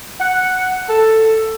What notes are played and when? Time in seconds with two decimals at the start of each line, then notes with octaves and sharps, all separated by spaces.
0.20 F#5
0.88 A4